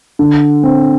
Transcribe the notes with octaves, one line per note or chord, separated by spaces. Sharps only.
D3
C4